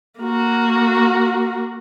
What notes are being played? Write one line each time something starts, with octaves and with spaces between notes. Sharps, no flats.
A#3 F#4